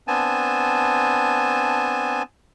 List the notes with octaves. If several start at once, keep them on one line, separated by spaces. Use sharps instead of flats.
B3 C4 D4 G#5 A5